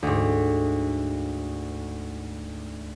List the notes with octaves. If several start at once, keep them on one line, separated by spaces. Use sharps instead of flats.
D2 G#2